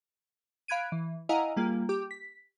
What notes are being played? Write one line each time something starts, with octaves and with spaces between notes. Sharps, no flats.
F5 B5 F#6 G#6 D7 D#7
E3
E4 D#5 F5 F#5 G#5 A#5
G3 A#3 F4 G#4
G4 D6
B6